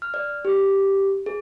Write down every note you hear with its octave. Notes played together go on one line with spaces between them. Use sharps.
F6
D5
G4
G#4